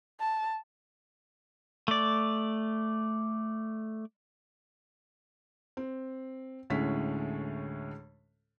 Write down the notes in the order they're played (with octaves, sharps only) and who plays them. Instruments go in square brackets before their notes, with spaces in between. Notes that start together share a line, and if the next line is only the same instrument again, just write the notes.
[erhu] A5
[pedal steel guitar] A3 D5
[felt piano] C4
D2 A2 G#3 C#4 B6